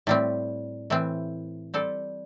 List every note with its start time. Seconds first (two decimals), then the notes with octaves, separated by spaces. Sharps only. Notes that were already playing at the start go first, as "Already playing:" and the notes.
0.07 A2 G3 C4
0.90 A2 E3 C4
1.74 G3 C4 A4